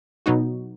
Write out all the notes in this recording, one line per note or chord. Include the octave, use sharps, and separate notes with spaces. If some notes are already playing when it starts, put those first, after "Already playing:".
B2 F#3 B3 D#4 F#4